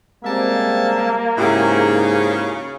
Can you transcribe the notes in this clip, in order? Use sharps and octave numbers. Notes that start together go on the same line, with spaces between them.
C#3 G3 G#3 A#3 C4 E5 A5
G#2 C#3 E4 F#4 G4